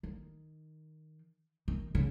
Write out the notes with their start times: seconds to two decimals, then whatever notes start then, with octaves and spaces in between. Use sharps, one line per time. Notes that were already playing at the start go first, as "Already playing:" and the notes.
0.03 D#3
1.68 D#3
1.95 C#3